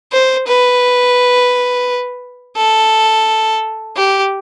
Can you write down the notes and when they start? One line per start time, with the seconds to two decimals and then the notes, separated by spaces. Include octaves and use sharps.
0.13 C5
0.48 B4
2.57 A4
3.97 G4